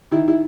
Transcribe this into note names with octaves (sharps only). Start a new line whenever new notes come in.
D#3 E4
E4